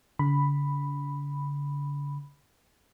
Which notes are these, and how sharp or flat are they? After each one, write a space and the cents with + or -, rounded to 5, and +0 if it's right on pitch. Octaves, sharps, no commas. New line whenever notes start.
D3 -45 B5 +0